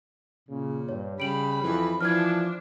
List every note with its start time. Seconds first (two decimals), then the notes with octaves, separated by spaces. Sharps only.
0.48 A#2 C#3
0.89 G2 C#5
1.20 C#3 G3 B5 D7 F#7
1.63 F2 E3
2.01 E3 F3 D4 F6 G#6